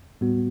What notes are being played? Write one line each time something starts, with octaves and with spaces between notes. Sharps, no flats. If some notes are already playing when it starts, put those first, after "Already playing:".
A2 G3 B3 F#4